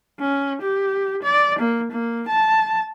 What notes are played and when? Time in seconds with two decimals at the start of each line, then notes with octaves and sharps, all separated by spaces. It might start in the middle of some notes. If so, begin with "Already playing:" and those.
0.20 C#4
0.62 G4
1.22 D5
1.59 A#3
1.91 A#3
2.28 A5